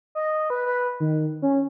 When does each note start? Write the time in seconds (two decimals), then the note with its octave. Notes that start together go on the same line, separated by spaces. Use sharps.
0.15 D#5
0.50 B4
0.66 B4
1.00 D#3
1.42 C#4